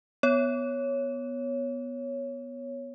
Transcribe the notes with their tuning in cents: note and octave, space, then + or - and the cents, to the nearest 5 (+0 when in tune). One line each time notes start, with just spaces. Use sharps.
B3 +0 C#5 +0